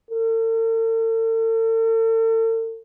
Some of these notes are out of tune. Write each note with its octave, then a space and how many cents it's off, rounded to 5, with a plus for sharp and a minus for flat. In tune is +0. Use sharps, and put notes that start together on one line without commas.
A4 +45